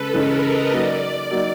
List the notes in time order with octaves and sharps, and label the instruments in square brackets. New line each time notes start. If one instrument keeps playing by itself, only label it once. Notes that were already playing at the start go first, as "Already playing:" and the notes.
Already playing: [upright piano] C#3 G#3 C#4 [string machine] A4 B4
[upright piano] C#3 E3 G#3 C#4 [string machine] A#4
[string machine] D#5
[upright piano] F#3 A#3 D#4 [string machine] D5
[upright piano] F#3 A#3 D#4